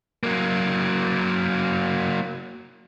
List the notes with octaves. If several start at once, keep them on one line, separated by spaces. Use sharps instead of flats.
F#3 A#3